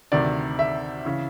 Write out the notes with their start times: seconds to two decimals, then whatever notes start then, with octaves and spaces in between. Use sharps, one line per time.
0.12 D2 C3 D#3 D5
0.59 E5
1.05 C#3 E3